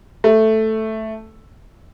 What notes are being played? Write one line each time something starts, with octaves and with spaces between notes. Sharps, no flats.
A3